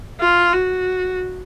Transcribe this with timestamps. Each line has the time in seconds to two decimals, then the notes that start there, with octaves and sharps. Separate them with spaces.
0.21 F4
0.53 F#4